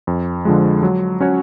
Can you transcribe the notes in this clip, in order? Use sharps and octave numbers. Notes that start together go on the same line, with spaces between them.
F2
D3 F3 G#3
F#3
C#4 F#4 C#5